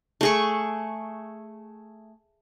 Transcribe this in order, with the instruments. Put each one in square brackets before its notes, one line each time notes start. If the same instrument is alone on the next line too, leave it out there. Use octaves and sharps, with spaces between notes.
[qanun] A3 G#4 C#6